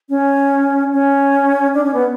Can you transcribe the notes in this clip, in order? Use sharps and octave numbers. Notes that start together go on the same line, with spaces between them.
C#4
C#4
D4
C#4
B3